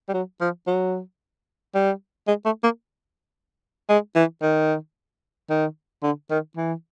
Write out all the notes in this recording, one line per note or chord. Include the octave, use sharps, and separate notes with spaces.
G3
F#3
F3
F#3
G3
G#3
A3
A#3
G#3
E3
D#3
D#3
D3
D#3
E3